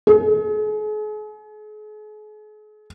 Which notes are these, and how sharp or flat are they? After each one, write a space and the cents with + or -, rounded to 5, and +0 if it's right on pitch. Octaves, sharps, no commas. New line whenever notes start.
G#4 +40